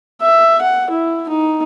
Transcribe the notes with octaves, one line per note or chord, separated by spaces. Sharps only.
E5
F#5
E4
D#4